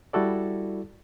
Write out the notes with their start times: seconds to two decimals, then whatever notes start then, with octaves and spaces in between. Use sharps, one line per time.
0.13 G3 E4 F#4 A4 D5